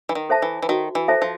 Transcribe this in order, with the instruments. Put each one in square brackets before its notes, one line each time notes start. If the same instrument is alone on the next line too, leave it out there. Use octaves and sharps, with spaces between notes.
[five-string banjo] E3
D#3
[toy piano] A4 C5 E5 A5
[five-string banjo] E3
E3
[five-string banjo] D#3 [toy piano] F#4
[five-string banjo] E3
[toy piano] A4 C5 E5 A5
[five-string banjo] F3